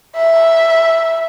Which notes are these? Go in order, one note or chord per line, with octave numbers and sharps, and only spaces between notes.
E5